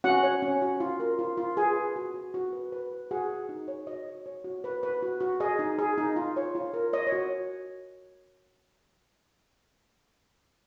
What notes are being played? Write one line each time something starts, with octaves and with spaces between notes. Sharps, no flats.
C#4 F#4 F#5
C#5
C#4
F#4
F4
A#4
F4
F4
G#4 B4 G#5
B4
F#4
F#4
F#4
B4
B4
B4
F#4 G#4 F#5
G#4
D#4
C#5
F#4 D#5
C#5
C#5
F#4
B4
B4
F#4
F#4
G#4 D#5
D#4
G#4
D#4
F4
C#5
F4
A#4
C#5 D#5
C#5
F#4